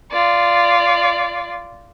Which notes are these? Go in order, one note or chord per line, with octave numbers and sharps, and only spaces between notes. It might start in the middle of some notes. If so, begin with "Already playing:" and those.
F4 D5